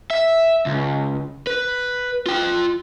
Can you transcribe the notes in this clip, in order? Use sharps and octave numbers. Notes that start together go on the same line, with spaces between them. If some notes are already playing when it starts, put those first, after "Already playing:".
E5
C#2
B4
F4 G5